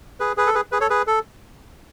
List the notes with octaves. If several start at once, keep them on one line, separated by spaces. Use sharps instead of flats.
G#4 B4
G#4 B4
A4
G#4 B4
G#4 B4
A4 C#5
G#4 B4
A4